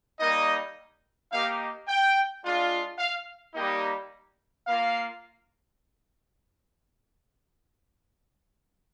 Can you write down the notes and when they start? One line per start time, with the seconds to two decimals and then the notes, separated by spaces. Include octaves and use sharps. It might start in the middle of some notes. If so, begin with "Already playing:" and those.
0.19 G3 A#3 D#4 D#5
1.31 A#3 D#4 G4 F5
1.87 G5
2.44 G#3 D4 F4
2.99 F5
3.55 G3 A#3 D#4 G4 D#5
4.66 A#3 F4 F5